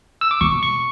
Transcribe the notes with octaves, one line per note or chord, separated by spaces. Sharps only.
E6
D6
B2 C#6
C#6